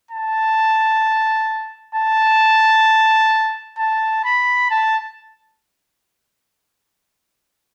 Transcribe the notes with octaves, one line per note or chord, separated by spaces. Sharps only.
A5
A5
A5
B5
A5